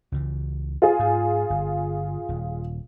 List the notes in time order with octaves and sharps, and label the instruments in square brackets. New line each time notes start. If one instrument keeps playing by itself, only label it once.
[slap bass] C#2 C#3 E3
[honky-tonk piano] F4 G#4
[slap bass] G#2
G1
D#1